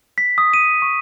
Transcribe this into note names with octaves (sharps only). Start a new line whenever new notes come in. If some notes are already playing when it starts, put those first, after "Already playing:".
B6
D#6
D#7
C#6